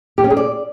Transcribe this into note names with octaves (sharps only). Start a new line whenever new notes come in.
G4
C#4
G#4
D5